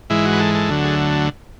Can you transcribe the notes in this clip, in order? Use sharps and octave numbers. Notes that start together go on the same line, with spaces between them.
G#2 E3 G#3 E4
F#4
B4
A4
A4
D2 D3 F#3 A3
G#4